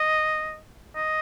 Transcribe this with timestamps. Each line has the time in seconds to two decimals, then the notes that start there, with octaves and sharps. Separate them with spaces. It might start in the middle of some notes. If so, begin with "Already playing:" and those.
Already playing: D#5
0.96 D#5